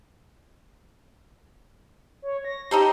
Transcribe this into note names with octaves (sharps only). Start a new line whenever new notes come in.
C#5
A#6
D#4 G4 A4 C5